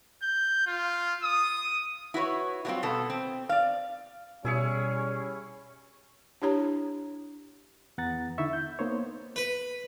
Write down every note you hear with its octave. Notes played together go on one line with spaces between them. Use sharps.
G6
F4
D#6
E4 F#4 B4 C#5
F#3 G3 A3 B3 C4 F4
B2 B3 A4
C4
D5 F5
B2 G3 C#4 E4 G#4 C#5
D4 E4 G4 C#5 A#5
E2 B3 F#5 A#5 A6
D3 D#4 E4 E5 C#6
G6
A#3 B3 D#4 C5 C#5
B4